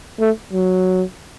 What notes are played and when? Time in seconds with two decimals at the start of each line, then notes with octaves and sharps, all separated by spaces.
0.20 A3
0.53 F#3